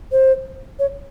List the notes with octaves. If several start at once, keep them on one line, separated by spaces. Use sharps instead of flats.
C5
C#5